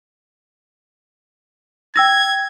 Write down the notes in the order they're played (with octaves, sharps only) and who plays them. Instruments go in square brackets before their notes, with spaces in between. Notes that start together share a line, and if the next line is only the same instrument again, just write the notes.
[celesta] G5 E6 A#6 [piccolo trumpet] G#6